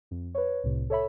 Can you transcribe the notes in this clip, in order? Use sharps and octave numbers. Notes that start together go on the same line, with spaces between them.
F2
B4 C#5
C2 A2 C3
A4 C#5 E5 B5